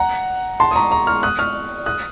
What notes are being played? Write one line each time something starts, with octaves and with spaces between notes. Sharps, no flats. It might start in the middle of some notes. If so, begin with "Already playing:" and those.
Already playing: F#5 A#5
A5 C6
D#6
A#5 C#6
A#5 C#6
C#6 F6
D#6 F#6
C#6 F6
D#6 F#6